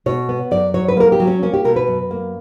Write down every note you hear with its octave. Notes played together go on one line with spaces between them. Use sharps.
B2 C#5
B3
F#2 D5
F#3 C#5
B4
A#3 A#4
G4
F#3
C#4
A#3 C#4
G4
B2 A#4
B4
F#2
A#3